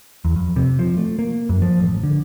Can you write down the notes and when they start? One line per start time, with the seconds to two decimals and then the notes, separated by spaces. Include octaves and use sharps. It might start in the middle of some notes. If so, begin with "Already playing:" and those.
0.25 E2
0.36 F2
0.56 C3
0.79 F3
0.98 A3
1.19 A#3
1.49 F#2
1.62 F3
1.79 A1
2.03 D3